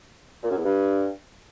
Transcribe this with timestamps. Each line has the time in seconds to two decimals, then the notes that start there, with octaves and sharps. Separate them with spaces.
0.43 A#2
0.50 F#2
0.58 E2
0.65 G2